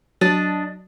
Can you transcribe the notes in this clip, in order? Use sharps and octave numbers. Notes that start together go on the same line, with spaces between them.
F#3 D4 D#5 A5